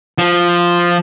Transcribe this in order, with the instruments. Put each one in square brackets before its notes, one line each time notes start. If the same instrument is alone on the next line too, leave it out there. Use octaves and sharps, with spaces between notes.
[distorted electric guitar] F3